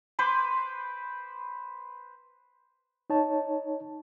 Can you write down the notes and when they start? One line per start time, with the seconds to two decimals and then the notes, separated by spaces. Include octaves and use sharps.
0.19 B4 C5 C6 D6
3.10 D#4 C#5 A5